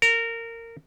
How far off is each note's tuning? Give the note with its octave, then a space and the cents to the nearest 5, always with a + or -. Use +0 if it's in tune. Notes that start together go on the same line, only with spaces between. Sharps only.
A#4 -20